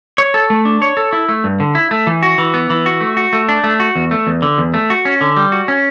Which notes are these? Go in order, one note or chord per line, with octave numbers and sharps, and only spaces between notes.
C#5
A4
A3
D4
C#5
A4
E4
A3
G2
D3
E4
A3
E3
F#4
E3
B3
E3
F#4
A3
F#4
A3
D4
A3
F#4
E2
A3
E2
D3
E2
A3
F#4
C#4
D3
G3
F#4
C#4